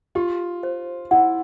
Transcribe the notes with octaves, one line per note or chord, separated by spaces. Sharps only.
F4 G4
C5
E4 F#5